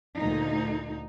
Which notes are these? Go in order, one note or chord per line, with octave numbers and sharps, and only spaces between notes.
D2 A#2 D#4